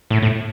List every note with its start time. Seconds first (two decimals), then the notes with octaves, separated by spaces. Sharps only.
0.10 A2
0.23 A2